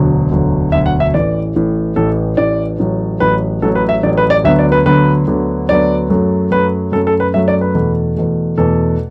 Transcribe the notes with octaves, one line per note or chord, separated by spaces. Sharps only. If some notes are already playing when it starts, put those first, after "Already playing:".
Already playing: E1 D2 D3 F#3
E1 D2 D3 F#3
E1 D2 D3 F#3 E5
F#5
E5
A1 A2 E3 D5
A1 A2 E3
A1 A2 E3 A4
A1 A2 E3 D5
A1 A2 F#3
A1 A2 F#3 B4
A1 A2 F#3 A4
B4
E5
A1 A2 F#3 D5
B4
D5
D2 D3 F#3 B3 E5
D5
B4
D2 D3 F#3 B3 B4
D2 D3 F#3 B3
D2 D3 F#3 B3 D5
F#2 F#3 A3
F#2 F#3 A3 B4
F#2 F#3 A3 A4
A4
B4
F#2 F#3 A3 E5
D5
B4
E2 B2 A3
E2 B2 A3
E2 B2 A3 A4